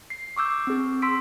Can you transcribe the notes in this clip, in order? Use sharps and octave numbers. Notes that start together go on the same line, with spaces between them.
C7
C#6 D6 E6 G6
C4 G#4
C6 E6 B6 D7